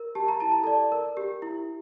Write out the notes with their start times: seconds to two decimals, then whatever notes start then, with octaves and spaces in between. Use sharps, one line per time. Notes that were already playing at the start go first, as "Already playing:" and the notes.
Already playing: A#4
0.15 G4 A5
0.28 A#5
0.40 E4 A5
0.52 A#5
0.63 A4 D5 A5
0.92 A#4
1.17 G4
1.42 E4